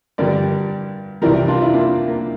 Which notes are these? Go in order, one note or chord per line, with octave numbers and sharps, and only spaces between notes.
G2 D3 G3 A#4 D5
C2 C3 E3 G3 A#4 D5
D4 F4
E4
A#3 D4
A#3